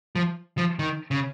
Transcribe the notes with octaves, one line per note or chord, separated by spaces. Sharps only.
F3
F3
D#3
C#3